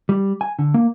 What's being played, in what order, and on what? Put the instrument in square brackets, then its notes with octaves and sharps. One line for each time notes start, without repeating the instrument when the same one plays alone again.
[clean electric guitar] G3
G#5
D3
A#3